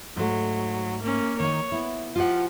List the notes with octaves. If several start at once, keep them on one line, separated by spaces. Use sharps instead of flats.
G#2 F#3 A3
A#3 C#4
D#3 D#4 C#5
B3 E4
F3 F4 G4 F#5